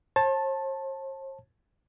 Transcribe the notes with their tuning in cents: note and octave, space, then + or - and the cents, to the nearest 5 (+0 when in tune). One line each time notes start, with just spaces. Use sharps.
C5 +45 A5 +0